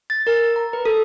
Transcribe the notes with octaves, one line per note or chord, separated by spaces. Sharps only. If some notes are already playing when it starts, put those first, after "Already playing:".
A6
A#4
A#5
B4
A4